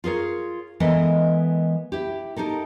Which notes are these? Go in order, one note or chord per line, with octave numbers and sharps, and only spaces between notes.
F4 G#4 A#4 C#5
E3 G#3 B3 A4 A#4 D#5
E4 G4
D#4 G4 A4 A#4